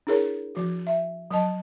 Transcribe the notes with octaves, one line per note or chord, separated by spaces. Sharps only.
D4 E4 G#4 A#4 C#5
F3 F#4
E5
F#3 D#5 A5